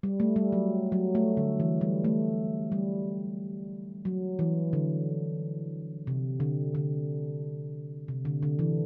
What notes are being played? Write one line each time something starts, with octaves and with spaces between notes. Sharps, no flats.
G3
A3
G3
F#3
F#3
A3
D3
E3
G3
A3
G3
F#3
E3
D3
C3
D3
D3
C3
D3
D3
E3